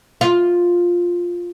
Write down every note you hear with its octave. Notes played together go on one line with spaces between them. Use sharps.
F4